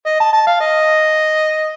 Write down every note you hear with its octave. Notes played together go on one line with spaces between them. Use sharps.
D#5
A5
A5
F5
D#5